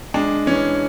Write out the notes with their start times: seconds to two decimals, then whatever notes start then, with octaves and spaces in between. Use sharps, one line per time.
0.14 G#3 D4
0.46 E3 C#4